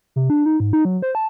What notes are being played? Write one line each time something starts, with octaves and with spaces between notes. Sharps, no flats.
C3
D4
D#4
G#2
D#4
F#3
C5
A5